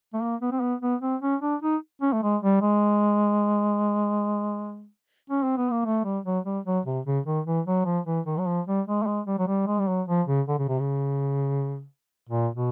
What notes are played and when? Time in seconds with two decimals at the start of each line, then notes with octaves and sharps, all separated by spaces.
0.14 A3
0.21 A#3
0.41 B3
0.52 C4
0.60 B3
0.81 B3
1.01 C4
1.22 C#4
1.42 D4
1.62 D#4
2.02 C#4
2.13 A3
2.23 G#3
2.43 G3
2.62 G#3
5.30 C#4
5.43 C4
5.57 B3
5.71 A#3
5.85 A3
6.04 G3
6.25 F#3
6.45 G3
6.65 F#3
6.86 C3
7.05 C#3
7.26 D#3
7.46 E3
7.66 F#3
7.85 F3
8.06 E3
8.26 D#3
8.39 F#3
8.47 F3
8.67 G3
8.87 G#3
9.03 A3
9.07 G#3
9.27 G3
9.39 F#3
9.48 G3
9.67 G#3
9.80 G3
9.88 F#3
10.08 F3
10.27 C#3
10.48 D3
10.59 C#3
10.69 C3
10.79 C#3
12.29 A#2
12.55 B2